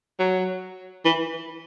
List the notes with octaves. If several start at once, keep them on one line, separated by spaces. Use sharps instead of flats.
F#3
E3